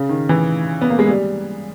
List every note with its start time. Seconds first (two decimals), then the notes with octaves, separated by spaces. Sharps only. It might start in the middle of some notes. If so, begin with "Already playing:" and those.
Already playing: C#3
0.09 D#3
0.29 E3
0.81 B3
0.90 A#3
0.99 G#3
1.07 G3